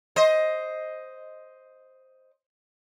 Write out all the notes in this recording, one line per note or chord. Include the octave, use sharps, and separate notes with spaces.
C5 D#5